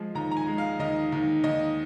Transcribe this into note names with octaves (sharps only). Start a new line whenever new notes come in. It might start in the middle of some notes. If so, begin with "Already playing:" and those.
Already playing: F3 G#3
D#2 A#5
A#5
G#5
G#3
F5
D#2 D#5
D#2
D#2 D#5